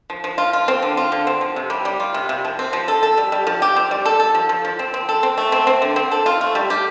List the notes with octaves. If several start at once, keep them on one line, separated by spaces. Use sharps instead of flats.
F3
F3
F4
F4
C4
D3
F4
D3
C4
F3
C3
G3
G3
F4
C3
C3
F3
C4
F3
A4
A4
G3
G3
F3
G4
C4
G3
A4
A4
F3
F3
F3
C4
C4
A4
C4
A3
C4
C4
D3
C4
A4
F4
A3
G3
G4